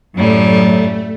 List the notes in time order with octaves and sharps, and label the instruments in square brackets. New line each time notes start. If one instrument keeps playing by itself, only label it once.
[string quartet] F#2 A2 G3 [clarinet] F#3 [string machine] A3